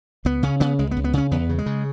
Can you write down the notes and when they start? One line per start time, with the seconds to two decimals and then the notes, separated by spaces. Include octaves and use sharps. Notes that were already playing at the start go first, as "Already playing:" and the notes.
0.25 C#2 B3
0.43 C#3 C#4
0.60 C#3 B3
0.79 C#2 G#3
0.91 B3
0.97 C#2
1.04 B3
1.13 C#3 C#4
1.31 E2 B3
1.49 C#3
1.59 G#3
1.66 C#3